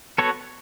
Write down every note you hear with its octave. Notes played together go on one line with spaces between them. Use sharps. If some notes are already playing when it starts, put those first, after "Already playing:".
B3 F#4 A4 C#5